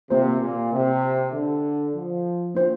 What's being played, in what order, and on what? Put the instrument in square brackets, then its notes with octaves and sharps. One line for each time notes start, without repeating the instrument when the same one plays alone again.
[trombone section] C3 [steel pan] A#3 F4 C5
[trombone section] A#2
C3
D3
F3
[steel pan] A#3 D4 F4 C5